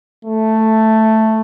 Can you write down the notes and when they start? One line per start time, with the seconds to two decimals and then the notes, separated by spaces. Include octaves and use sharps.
0.25 A3